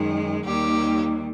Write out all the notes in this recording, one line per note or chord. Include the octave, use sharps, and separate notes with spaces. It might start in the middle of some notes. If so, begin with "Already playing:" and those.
Already playing: F#2 D#3 G#3
D#2 D#3 G3 A#3 G4